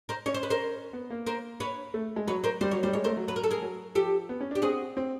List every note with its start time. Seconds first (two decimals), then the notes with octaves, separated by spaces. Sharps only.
0.09 A#4 C5
0.26 C#4 C#5
0.34 C5
0.43 B4
0.50 A#4 C5
0.93 B3
1.10 A#3
1.27 A#4 C5
1.60 B4 C#5
1.94 A3
2.16 G#3
2.27 F#3 B4 C#5
2.44 A#4 C5
2.61 G3 C5
2.71 F#3 C#5
2.83 G3 C5
2.93 G#3 C#5
3.04 A3 A#4 C5
3.17 F#3
3.28 F#3 B4
3.36 A#4
3.44 A4
3.51 G#4 A#4
3.62 F#3
3.95 F3 G4 A4
4.29 B3
4.41 C#4
4.51 D4 G4
4.62 C4 F#4 G#4
4.97 C4